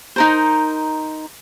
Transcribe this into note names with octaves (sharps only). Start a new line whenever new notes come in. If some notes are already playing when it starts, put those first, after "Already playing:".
D#4 A#4 C5